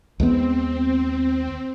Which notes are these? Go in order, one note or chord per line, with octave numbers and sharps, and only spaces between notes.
D#2 G#3 B3 C4